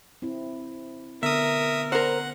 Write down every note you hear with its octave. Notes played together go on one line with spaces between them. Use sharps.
C4 E4
D3 B3 A#4 E5 D#6
A#4 C5 F#5